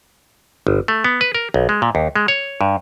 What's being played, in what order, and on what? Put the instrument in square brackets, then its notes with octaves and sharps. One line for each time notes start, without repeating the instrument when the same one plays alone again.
[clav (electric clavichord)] G1
A3
B3
B4
A#4
B1
G#3
A#2
D#2
G#3
C#5
G2